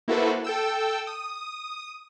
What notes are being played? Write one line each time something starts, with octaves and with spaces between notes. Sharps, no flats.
A#3 E4 F#4 A4 B4 C5
A4 G5 E6
D#6